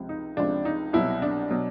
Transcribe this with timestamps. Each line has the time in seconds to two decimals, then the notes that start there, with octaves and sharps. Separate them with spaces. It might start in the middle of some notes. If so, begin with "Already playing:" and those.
Already playing: C#2 C3 F3
0.09 D#4
0.37 C#2 C3 F3 D4
0.65 D#4
0.93 C2 B2 F#3 E4
1.22 D4
1.50 B2 F#3